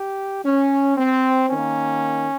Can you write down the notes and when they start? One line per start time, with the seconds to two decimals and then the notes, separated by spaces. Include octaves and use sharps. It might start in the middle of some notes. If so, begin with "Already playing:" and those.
Already playing: G4
0.44 C#4
0.97 C4
1.50 D#3 A#3 C#4